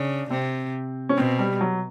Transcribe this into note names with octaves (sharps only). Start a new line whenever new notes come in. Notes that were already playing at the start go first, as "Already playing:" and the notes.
Already playing: C#3 D4
C3 C4
C#4
B2 C4
G3
F#3